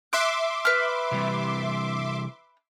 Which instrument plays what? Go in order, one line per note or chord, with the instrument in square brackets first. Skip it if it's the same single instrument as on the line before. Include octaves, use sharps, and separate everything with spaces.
[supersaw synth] E5 C6 D6 [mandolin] F#6
[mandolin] B4 F6
[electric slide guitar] C3 E3 G3